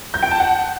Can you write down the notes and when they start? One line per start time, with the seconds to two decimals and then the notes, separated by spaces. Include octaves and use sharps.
0.14 G6
0.23 G5
0.31 A5
0.40 F#5